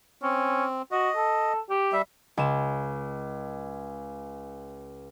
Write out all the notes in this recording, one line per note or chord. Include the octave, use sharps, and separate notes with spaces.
C4 C#4
F#4 D#5
A4
G4
G3 E5
C#2 E7